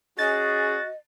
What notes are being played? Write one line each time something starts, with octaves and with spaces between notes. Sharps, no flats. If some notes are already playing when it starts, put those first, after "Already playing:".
C#4 F#4 G#4 D#5 A6